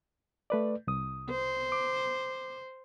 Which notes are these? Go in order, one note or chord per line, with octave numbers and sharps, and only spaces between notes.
A3 B4 D5
C2 D#6
C5
D6